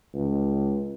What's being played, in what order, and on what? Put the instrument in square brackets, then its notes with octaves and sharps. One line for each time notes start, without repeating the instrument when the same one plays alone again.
[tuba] C#2